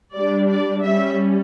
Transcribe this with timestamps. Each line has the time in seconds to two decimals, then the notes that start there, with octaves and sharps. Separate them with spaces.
0.15 G3 D4 D5
0.49 D5
0.83 G3 C#4 E5